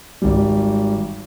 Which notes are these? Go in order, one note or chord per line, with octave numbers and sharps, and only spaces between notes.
G#1 G3